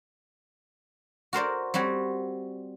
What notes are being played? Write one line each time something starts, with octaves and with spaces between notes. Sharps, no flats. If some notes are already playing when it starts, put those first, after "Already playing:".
F#4 A#4 C5 D5
G3 C4 F#4 C#5